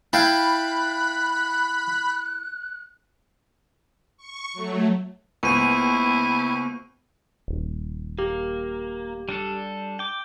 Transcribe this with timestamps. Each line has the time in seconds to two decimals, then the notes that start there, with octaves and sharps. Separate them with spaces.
0.13 E4 F5 G5 A5 B5 F#6
4.17 C#6
4.53 F#3 A3
5.43 C#2 A#3 B3 E4 C5 C#6 D#7
7.48 D#1
8.19 A#3 G4
9.29 G3 D4 A4
9.99 G5 D6